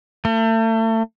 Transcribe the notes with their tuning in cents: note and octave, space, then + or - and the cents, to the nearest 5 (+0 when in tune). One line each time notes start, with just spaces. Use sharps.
A3 +35